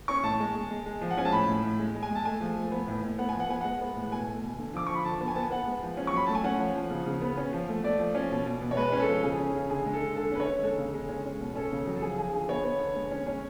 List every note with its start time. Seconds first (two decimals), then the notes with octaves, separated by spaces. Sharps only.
0.08 C#4 C#6
0.23 A2 A5
0.40 G#3
0.55 G#3
0.71 G#3
0.86 G#3
1.01 F3
1.10 F#5
1.17 C#4 G#5
1.25 A5
1.32 A2 B5
1.48 A2
1.63 A2
1.79 G#3
1.95 G#3
2.03 G#5
2.10 G#3 A5
2.25 A3 G#5
2.40 F3
2.57 A3
2.71 B3
2.88 A2
3.03 A2
3.18 B3 F#5
3.29 G#5
3.34 F3
3.40 F#5
3.49 B3 G#5
3.61 G#3 F#5
3.81 B3
3.96 A2
4.12 B2 G#5
4.27 A3
4.42 B2
4.58 D3
4.73 F3 D6
4.87 F3 C#6
4.95 B5
5.04 D3 A5
5.21 B3
5.28 G#5
5.35 B3 A5
5.42 G#5
5.51 B3 F#5
5.67 G#3
5.82 F3
5.97 C#4
6.07 C#6
6.13 F#3 B5
6.27 A3 A5
6.35 G#5
6.44 C#4 F#5
6.59 F3
6.75 F3
6.90 C#3
7.06 C#3
7.22 B3
7.37 C#4
7.53 F3
7.68 A3
7.83 A3 D5
7.99 F3
8.15 C#4
8.31 B2
8.46 B2
8.62 B2
8.71 C#5
8.77 G#3 B4
8.92 C#4
9.00 A4
9.08 F3
9.23 C#3 G#4
9.39 C#4
9.54 C#3
9.70 D3 G#4
9.86 G#3
9.93 A4
10.01 D3
10.16 D3 A4
10.32 C#4 B4
10.40 C#5
10.47 D3
10.63 G#3 A4
10.78 C#3
10.94 G#3
11.09 C#4
11.25 C#4
11.40 B2
11.55 C#4 A4
11.72 C#3
11.87 F#3
11.96 A4
12.02 F3 G#4
12.18 F3 G#4
12.33 D3 G#4
12.49 B3 C#5
12.65 B3
12.80 D3
12.96 G#3
13.11 C#4
13.27 C#4